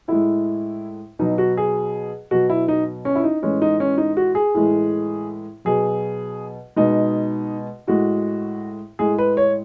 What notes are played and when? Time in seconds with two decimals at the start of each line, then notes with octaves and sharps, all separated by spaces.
0.08 A2 G#3 E4
1.19 B2 F#3 D#4
1.38 F#4
1.57 G#4
2.31 B2 F#3 F#4
2.50 E4
2.68 D#4
3.05 C#4
3.16 E4
3.24 D#4
3.42 A2 E3 G#3 C#4
3.62 D#4
3.80 C#4
3.98 D#4
4.17 F#4
4.35 G#4
4.54 A2 E3 G#3
5.65 B2 F#3 G#4
6.76 B2 G#3 D#4
7.87 A2 G#3 F#4
8.99 A2 G#3 G#4
9.18 B4
9.37 C#5